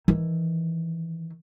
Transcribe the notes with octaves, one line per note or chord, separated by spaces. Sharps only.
D#3 E3